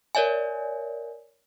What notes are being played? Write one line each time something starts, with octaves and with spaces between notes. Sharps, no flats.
A#4 C#5 D5 E5 G#5